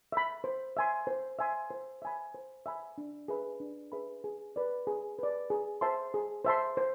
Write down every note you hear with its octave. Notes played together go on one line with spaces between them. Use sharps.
E5 B5
C5
E5 G#5 C6
C5
E5 G#5 C6
C5
E5 G#5 B5
C5
E5 G#5 B5
D4
G#4 B4 E5 B5
D4
G#4 B4 E5 B5
G#4
B4 D5
G#4
B4 D5
G#4
C5 E5 A5 C6
G#4
C5 E5 A5 C6
C5